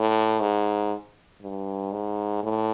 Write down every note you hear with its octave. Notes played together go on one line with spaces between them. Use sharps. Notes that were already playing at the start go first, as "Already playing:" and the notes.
Already playing: A2
G#2
G2
G#2
A2